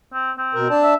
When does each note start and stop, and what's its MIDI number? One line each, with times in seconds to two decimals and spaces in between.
0.13 0.31 60
0.38 0.77 60
0.54 0.68 47
0.54 0.68 70
0.70 0.94 62
0.70 0.94 74
0.70 0.94 81
0.83 0.96 76